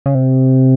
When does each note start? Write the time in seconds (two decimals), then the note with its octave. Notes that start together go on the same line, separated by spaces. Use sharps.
0.06 C#3
0.15 C3